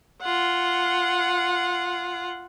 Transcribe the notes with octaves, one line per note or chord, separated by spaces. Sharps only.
F4 F#5